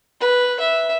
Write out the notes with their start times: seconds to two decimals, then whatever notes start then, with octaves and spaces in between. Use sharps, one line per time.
0.20 B4
0.60 E5